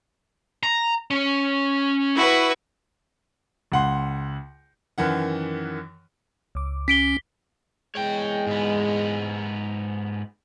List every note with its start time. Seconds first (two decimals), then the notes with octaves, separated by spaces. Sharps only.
0.63 A#5
1.11 C#4
2.14 E4 F#4 B4
3.72 C#2 F#5 C6
4.98 F#2 D#3 E3 F#5
6.55 C#2 D6
6.88 C#4 B6 D7 G7
7.95 E2 G#3 C#5 G5
8.47 G#2 B3